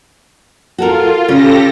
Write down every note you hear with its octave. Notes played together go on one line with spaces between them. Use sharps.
F4 F#4 A4 A#4
C#3 G4 A4 C#5 A#6